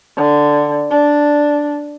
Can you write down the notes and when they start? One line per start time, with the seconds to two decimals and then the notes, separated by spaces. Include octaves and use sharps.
0.17 D3
0.91 D4